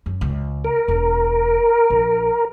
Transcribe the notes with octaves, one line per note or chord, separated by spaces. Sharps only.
F#2
C#2
A#4
E1
A#1